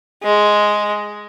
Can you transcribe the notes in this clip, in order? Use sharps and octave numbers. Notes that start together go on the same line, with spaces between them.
G#3